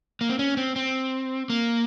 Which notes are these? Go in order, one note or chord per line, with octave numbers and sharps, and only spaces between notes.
A#3
C4
C#4
C4
C4
A#3